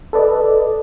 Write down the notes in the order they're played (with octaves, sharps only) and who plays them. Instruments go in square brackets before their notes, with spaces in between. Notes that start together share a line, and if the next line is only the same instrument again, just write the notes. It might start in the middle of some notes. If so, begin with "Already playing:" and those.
[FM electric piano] A4 B4 D5 D#5